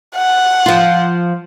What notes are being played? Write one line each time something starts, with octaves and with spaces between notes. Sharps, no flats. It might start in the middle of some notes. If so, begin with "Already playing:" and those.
F#5
F3 F4